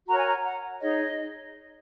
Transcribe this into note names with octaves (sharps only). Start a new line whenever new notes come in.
F#4 A#4 C#5 A#5
G#5
A#5
F#5
D#4 G#4 C#5 D#5